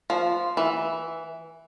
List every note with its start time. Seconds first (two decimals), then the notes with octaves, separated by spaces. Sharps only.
0.10 F3
0.57 E3